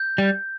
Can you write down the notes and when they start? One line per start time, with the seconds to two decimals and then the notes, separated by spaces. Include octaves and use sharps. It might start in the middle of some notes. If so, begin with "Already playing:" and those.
Already playing: G6
0.18 G3